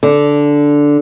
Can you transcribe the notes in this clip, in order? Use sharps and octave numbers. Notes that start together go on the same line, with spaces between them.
D3